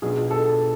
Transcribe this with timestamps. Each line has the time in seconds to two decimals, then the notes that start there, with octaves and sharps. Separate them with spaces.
0.02 B1 B2 B3 D4 F4 G#4
0.31 A4